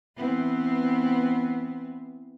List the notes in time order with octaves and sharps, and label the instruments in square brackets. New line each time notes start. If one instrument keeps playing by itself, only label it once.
[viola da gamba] E3 B3 C4